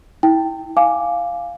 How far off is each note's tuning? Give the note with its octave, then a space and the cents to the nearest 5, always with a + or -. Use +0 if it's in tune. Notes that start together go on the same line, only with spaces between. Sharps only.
E4 -25 G5 +0
F5 +0 G#5 +0 D6 +0